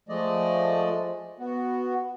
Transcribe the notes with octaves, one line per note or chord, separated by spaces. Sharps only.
F3 G#3 A3 D5 D#5
B3 F#4